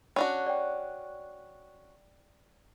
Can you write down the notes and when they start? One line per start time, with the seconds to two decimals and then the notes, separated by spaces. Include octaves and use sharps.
0.16 C#4 D4 F#4
0.46 D5 G5